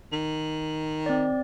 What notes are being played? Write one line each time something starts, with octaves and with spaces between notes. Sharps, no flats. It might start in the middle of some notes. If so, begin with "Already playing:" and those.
D#3
C4 D5